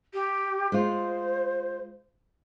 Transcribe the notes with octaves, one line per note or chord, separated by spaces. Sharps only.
G4
G#3 F4 C5